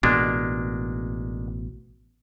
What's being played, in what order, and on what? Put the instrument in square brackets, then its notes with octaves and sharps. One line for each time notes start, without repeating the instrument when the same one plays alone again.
[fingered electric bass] A1 B2 [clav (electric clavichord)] G#3 A#3 D4